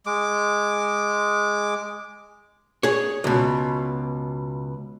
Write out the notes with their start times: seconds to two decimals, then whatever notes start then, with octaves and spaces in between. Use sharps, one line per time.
0.06 G#3 D6
2.83 G#4 C#5
3.24 C#2 B2